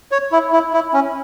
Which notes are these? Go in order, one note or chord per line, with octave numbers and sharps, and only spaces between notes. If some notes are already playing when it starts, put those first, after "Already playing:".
C#5
E4
E4
E4
C#4